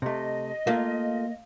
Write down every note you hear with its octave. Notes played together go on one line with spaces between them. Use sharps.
C3 A3 D#5
A3 A#3 F4